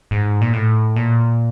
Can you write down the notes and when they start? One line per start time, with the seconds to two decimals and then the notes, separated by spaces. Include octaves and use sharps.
0.11 G#2
0.41 A#2
0.53 A2
0.96 A#2